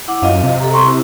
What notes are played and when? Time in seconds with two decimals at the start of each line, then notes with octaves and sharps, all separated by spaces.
0.08 E4 F#5 D6
0.22 F#2 F4 D#5 F5
0.43 C3
0.60 A4 A#5
0.74 C6 C#6
0.87 E4